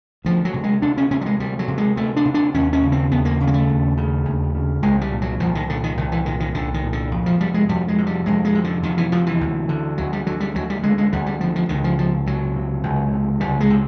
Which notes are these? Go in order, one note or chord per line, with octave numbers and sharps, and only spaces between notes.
D2 F3
F#3
C3
G#3
D2 D4
C#4
C3 C#4
G3
G#3
D2 G3
F#3
C3
G#3
D2 A3
D4
C3
D4
D#2 C#4
C#4
C#3
C4
D#2 B3
A#3
C#3
A#3
A3
D#2
C#3
D#2
C#3
C2 G#3
G3
A#2
F#3
C2 F3
D#3
A#2 D3
D#3
C2 D#3
E3
A#2 D#3
D#3
C2 D3
D#3
A#2
D3
F2
F3
C3 G3
G#3
F2 G3
G#3
C3
G3
F2 G#3
G#3
C3
D3
F2 D#3
E3
C3 F3
E3
D2
D3
D2 F#3
G3
D3 F#3
G3
D2 F#3
G3
D3 G#3
G#3
D2 G3
G3
D3 F3
F3
C#2 D#3
F3
C3 F3
C#2 F#3
C3
C#2
C3
C#2 G3
G#3
C3